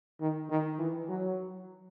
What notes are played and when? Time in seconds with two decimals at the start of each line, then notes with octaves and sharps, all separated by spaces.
0.20 D#3
0.50 D#3
0.79 E3
1.09 F#3